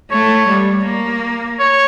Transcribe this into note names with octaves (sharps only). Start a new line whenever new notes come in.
A3 C#5
G3
A#3
C#5